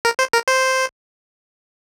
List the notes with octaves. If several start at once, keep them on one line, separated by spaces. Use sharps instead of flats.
A#4
C5
A#4
C5